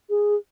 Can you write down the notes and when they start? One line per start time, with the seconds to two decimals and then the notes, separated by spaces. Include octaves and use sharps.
0.10 G#4